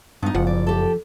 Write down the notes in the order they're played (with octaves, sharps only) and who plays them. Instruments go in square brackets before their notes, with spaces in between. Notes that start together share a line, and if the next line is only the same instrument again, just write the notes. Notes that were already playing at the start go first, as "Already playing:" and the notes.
[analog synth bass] G2 [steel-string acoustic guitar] B3 D#4
[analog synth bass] F#1 [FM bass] F3 [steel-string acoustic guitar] F#5
[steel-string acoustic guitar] D5
G4 A4